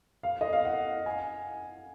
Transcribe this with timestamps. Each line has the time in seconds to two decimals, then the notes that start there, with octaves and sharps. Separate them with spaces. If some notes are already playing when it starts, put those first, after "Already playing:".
0.23 F5
0.41 D#5
0.53 F5
0.65 F#5
1.06 G#5